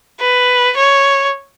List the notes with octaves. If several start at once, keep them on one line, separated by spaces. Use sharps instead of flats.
B4
C#5